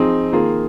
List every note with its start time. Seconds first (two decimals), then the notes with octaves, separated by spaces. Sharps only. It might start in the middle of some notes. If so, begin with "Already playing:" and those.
Already playing: F3 C4 D#4 G#4
0.32 D#3 A#3 F4 G#4